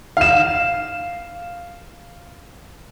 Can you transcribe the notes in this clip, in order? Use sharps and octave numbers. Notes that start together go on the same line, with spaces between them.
F5 E7